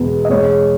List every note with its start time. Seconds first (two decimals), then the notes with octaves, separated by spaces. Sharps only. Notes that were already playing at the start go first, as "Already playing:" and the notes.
Already playing: E2 B2 G#3 B3
0.25 D#5
0.30 E2 B2 G#3 C#5